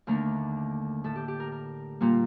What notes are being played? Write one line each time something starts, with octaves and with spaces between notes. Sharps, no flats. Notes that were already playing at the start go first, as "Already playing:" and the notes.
D#2 D3 A3 A#4
A2 A3 A4
G4
G4
A#4
A#4
A#2 G3 A#3